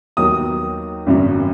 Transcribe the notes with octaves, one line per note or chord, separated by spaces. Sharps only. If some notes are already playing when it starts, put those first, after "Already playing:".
D#2 D#3 F#3 B3 D#6
G#1 F#2 C#3 F#3